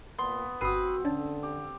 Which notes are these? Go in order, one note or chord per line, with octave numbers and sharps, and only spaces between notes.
A#2 B3 C6
G1 C4 F#4 B4 D#6 C7 D#7
D3 C#4 D4 A5
G4